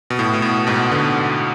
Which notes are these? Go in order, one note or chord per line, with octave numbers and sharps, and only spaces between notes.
B2
A2
B2
A2
G#2 B2
B2 D3